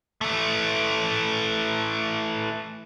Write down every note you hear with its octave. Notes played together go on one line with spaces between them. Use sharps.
E3 A3